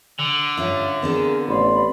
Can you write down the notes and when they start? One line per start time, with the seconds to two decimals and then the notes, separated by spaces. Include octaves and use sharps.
0.19 D3
0.57 G2 C#4 F4 C#5 E5
1.02 B3 C4 D4 F4 G#4 A#4
1.48 A1 D5 B5 C6